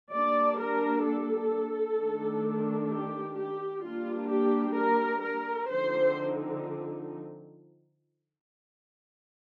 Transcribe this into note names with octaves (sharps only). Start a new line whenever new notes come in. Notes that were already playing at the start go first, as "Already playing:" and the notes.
G3 A#3 D4 D5
A#4
A4
D#3 A3 D4
G4
G4
G3 A#3 D4 F4
G4
A#4
A#4
D3 F3 C4 D#4 C5